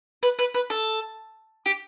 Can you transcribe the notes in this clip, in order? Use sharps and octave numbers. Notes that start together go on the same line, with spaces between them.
B4
B4
B4
A4
G4